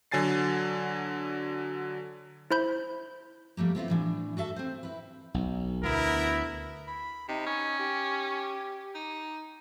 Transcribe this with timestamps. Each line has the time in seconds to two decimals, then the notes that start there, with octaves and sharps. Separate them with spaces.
0.11 D3 F#3 G#5 A6 C7
2.51 E4 C5 B5 G6
3.57 F3 G3 A3 A#3
3.75 B3 C4 E4 F4
3.88 A2 E3 D4
4.37 F#4 A4 E5 A5
4.56 C4 C5
4.83 E4 B4
5.34 B1
5.83 D2 B3 E4 A#4
6.87 B5
7.29 C3 D#4
7.47 C#4
7.79 G4
8.94 D#4